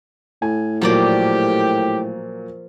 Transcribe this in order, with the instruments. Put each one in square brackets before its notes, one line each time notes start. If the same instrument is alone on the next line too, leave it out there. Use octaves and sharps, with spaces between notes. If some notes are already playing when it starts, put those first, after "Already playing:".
[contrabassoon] A2 [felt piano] G#5
[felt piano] A#2 F#3 [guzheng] F3 A#3 D5 [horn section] G4